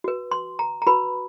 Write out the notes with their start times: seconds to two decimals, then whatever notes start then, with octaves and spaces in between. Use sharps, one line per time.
0.04 F#4 B4
0.31 C6
0.59 A#5
0.82 A#5
0.87 F#4 B4 B5